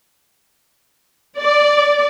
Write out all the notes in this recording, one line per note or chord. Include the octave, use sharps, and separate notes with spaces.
D5